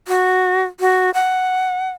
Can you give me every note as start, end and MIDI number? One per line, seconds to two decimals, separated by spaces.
0.08 0.64 66
0.80 1.10 66
1.14 1.90 78